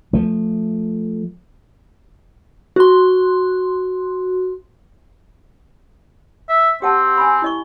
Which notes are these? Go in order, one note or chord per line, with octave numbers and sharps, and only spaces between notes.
F3 A3
F#4 C6
E5
C4 G4 F#5 A5
G#5 B5
E4 D#5 C#6